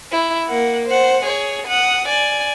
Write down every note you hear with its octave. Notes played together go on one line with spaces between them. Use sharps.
E4
A#3 F#5
C5 F#5
G#4 C#5
F#5 D#6
D5 G#5